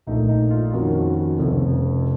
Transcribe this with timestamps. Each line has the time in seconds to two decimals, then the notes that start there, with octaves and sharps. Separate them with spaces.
0.07 A#1 A#2 A3 D#4
0.29 D#4
0.51 F4
0.73 F2 D#3 A#3 C#4 F#4
0.95 F#4
1.17 F#4
1.39 F1 F2 C#3 A4